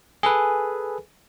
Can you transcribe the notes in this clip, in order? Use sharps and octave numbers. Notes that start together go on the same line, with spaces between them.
G#4 A4 B4 G#5